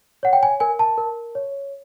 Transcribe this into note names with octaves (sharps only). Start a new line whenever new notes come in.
C#5 F#5
G5
G#5
A#4 G#5
A5
A#4
C#5